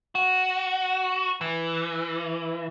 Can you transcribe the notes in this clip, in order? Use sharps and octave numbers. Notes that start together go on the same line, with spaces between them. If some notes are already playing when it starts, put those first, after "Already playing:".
F#4
E3